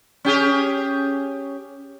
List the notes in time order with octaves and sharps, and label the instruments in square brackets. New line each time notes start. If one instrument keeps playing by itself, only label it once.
[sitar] C#4 G4 G#4